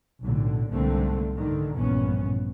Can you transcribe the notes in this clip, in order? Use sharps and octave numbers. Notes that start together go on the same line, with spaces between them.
B1 A2 D3
C2 G#2 D3 A3 A#3 C4
G#2 D3 D#3
A#1 E2 G2 A#2 B3 C#4